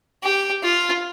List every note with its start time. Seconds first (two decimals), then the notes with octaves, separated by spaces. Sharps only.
0.23 G4
0.63 F4